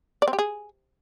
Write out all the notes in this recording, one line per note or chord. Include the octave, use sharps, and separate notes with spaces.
D5
C4
G4
G#4